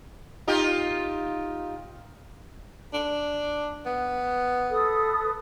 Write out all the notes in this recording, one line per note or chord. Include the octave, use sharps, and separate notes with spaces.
D#4 F4 G4
D4
B3
A4 B4 D#6